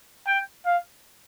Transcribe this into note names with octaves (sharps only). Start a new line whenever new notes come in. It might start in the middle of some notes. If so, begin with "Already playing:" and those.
G5
F5